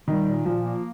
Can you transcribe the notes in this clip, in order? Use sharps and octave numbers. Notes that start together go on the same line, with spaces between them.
D#3 G3
A#2
A#2 F3
A#3